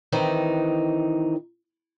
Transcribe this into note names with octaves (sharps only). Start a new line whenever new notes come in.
D#3 E3 C4 D#4